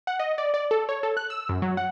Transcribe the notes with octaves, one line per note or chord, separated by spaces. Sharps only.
F#5
D#5
D5
D5
A4
C#5
A4
F#6
E6
F#2
F#3
F#5